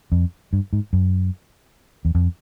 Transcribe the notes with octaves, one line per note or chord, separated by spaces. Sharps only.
F2
G2
G#2
F#2
E2
F2